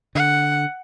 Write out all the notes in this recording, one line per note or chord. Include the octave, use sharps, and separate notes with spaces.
D3 F#5